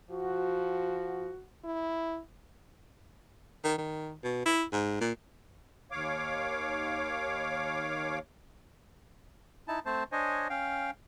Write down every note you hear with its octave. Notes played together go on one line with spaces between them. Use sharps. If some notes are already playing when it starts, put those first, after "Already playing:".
F3 F#4
E4
D#3
D#3
B2
E4
G#2
A#2
D#2 C#5 F5 D6
D#4 E4 A5
A3 C4 C5 A5
D4 C5 C#5 D#5 G#5
C#4 F5 G5